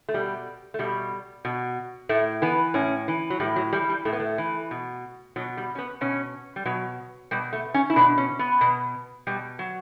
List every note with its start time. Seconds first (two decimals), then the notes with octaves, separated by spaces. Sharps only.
0.09 A3
0.14 B2 G3
0.74 A3
0.79 B2 G3
1.45 B2
2.09 A2 A3
2.42 E3 B3
2.74 A2 C#4
3.08 E3
3.30 F#3
3.40 A2 G3
3.56 F#3
3.73 E3 G3
3.89 G3
4.05 A2 A3
4.13 B3
4.20 A3
4.38 E3
4.71 B2
5.36 B2 F#3
5.57 G3
5.75 C#4
5.78 B3
6.01 B2 C#4
6.56 G3
6.65 B2 F#3
7.31 B2 G3
7.53 A3
7.74 C#4
7.90 E4
7.96 B2 D4
8.18 C#4
8.39 B3
8.61 B2
9.27 B2 G3
9.59 F#3